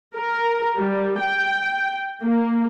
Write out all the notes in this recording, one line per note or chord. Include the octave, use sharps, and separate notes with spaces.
A#4
G3
G5
A#3